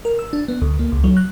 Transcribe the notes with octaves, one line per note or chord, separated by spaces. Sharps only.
A#4
E6
D4
B3
D2
A#3
C#2
F#3
F#6